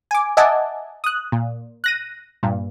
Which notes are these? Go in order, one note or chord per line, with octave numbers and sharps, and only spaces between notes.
G#5 D6
D#5 E5 F#5 G#5 A5 D6
D#6 F#6
A#2
F#6 A#6 D#7
G2 A#2